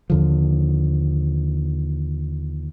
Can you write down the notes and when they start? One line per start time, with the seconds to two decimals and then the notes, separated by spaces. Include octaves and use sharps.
0.10 D#2 D3 F3